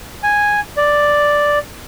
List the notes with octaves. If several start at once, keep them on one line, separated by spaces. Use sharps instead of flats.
G#5
D5